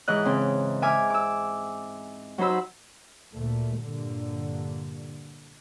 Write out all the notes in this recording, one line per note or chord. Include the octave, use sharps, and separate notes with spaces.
G#2 E3 D#5 F#6
C#3 C4
E5 G#5 D6 F6
D6 E6
F#3 D#4 C5 B5 E6
D2 A#2 A3
G2 A#2 D3